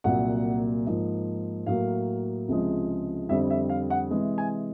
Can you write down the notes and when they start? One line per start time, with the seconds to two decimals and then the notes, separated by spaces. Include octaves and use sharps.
0.04 C2 A#2 F#3 A#3 F#5
0.86 G#2 F3 A#3
1.66 A2 F#3 A#3 F5
2.48 C#2 C3 F3 G#3
3.29 F2 D3 G3 C4 E5
3.50 E5
3.69 F5
3.90 F#5
4.11 C3 E3 G#3
4.38 G#5